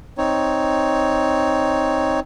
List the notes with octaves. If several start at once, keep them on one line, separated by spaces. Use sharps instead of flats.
C4 D#4 C#5